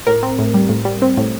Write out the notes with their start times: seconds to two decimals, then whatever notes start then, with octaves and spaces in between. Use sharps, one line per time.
0.07 A2 A#4
0.23 C4
0.39 A2
0.54 G3
0.69 A2
0.85 G3
1.02 C4
1.17 A2